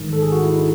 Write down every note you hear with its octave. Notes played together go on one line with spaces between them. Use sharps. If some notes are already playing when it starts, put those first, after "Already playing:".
Already playing: A1 G#2 D#3
A4
G#4
F#4
E4
D#4